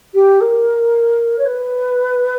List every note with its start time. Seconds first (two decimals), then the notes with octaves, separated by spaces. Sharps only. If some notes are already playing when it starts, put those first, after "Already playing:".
0.14 G4
0.40 A#4
1.38 C#5
1.45 B4